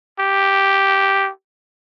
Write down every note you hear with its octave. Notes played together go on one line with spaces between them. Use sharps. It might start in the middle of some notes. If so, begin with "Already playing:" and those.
G4